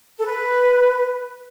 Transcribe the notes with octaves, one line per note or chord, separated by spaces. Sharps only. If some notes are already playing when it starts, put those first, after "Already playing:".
A4
B4